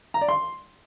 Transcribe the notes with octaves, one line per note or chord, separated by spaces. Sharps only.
A#5
D5
C6